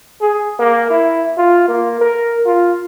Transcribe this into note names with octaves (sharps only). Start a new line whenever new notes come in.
G#4
A#3
E4
F4
A#3
A#4
F4